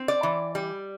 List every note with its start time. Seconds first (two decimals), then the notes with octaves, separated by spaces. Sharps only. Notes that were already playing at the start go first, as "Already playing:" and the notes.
Already playing: C4
0.08 D5
0.23 E3
0.55 G3